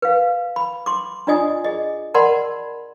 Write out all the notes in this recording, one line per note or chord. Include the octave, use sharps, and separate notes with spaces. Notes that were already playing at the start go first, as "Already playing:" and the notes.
B4 F5
B5
C6 D6
D4 F4 D5 D#5 G#5 D#6
G#4 D#5
A#4 D5 F#5 A5 B5 C6